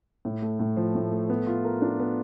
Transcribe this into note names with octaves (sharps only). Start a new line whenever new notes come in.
A2
A3
A2
F3
A2
A3
B3
F4
A#4
D4
B3